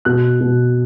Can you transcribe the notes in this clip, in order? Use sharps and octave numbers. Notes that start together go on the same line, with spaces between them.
B2 F#6
B2